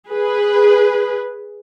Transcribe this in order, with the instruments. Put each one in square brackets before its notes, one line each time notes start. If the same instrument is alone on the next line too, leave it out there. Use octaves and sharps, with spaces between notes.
[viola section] G#4 B4